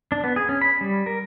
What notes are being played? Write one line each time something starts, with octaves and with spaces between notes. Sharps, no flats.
D4
B3
G#4
C#4
B5
G3
A#4